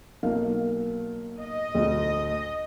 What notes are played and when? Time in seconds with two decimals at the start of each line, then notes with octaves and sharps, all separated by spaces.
0.23 B1 A#3 F5
1.42 D#5
1.75 D2